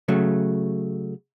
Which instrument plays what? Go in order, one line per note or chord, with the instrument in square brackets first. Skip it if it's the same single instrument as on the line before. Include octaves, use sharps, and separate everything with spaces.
[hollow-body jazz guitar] C#3 F#3 A3